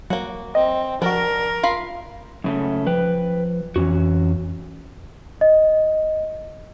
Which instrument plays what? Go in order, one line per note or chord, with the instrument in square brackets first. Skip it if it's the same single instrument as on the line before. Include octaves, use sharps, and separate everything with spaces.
[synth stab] F#3 [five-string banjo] A#3 F#4
[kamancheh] C4 [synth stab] D#5
[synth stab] F3 F#4 [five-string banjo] D4 [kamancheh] A#4
[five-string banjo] F4 F5 B5
[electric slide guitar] F#2 C#3 A3
[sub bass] F3 [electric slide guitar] B4 G5
[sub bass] F2 [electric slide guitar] E3 C#4 F#4
[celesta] D#5